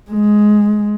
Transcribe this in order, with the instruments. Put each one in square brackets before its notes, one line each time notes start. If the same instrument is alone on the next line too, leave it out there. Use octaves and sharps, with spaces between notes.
[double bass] G#3